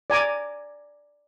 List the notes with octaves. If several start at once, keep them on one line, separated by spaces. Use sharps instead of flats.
D5 G#5 A#5 D6